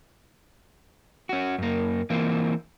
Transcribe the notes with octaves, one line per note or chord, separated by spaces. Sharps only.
C#4 F#4
F#2 A#3
E3 A#3 C4 F4